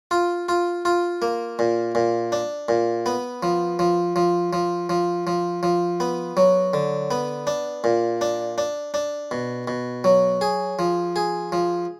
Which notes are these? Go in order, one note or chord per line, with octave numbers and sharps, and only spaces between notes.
F4
F4
F4
A#3
A#2
A#2
D4
A#2
B3
F3
F3
F3
F3
F3
F3
F3
B3
F#3
D3
B3
D4
A#2
D4
D4
D4
B2
B2
F#3
G#4
F3
G#4
F3